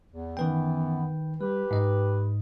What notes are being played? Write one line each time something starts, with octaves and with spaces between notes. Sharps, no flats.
E2
F#2 D#3 E3 B3 B4 G5
G3 G4 B4
G#2 D#5